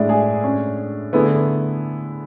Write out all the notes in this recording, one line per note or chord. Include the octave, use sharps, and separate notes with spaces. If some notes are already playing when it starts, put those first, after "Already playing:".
Already playing: A2 G#3 D4 E4
G#4
C#4
D3 A3 B3 E4 G#4